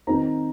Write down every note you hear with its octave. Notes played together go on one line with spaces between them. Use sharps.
D#3 C4 D#4 A#5